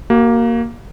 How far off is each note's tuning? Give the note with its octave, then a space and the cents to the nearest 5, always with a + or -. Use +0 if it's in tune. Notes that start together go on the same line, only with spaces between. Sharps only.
A#3 +0 F#4 +40